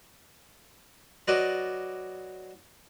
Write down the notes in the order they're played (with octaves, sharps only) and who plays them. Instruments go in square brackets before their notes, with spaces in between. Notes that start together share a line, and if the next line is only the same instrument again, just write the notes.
[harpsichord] F#3 B4 D5 D#5